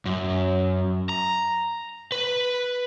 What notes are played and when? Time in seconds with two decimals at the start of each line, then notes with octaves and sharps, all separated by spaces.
0.06 F#2
1.09 A#5
2.12 B4